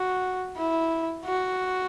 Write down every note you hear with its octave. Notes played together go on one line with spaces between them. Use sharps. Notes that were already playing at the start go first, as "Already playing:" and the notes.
Already playing: F#4
E4
F#4